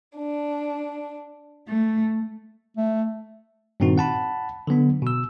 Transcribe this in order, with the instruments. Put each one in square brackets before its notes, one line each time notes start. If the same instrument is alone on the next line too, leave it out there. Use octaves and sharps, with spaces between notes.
[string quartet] D4
A3
[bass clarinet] A3
[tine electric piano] G2 A#2 D#3 C4 D#4 F#4
F#5 A5 B5
D3 F#3 B3 D4
B2 E6